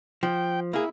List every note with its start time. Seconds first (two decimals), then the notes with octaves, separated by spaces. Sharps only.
0.23 F3 G5
0.73 A#3 E4 G#4